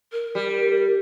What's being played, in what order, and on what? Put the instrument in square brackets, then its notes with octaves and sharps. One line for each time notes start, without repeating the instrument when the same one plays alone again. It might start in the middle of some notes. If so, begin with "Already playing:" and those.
[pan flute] A#4
[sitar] G3